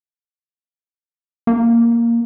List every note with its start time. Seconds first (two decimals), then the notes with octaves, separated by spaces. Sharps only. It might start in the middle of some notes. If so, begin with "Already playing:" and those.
1.47 A#3